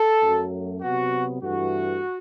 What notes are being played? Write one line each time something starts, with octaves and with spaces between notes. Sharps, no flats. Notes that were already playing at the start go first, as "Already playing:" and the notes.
Already playing: A4
F#2 F#3 A3
C3 F#3 B3 F#4
G2 E3 A3 F#4